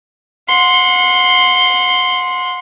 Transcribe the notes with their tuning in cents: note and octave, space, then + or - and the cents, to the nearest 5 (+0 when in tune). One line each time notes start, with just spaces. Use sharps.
F#5 -35 C6 +0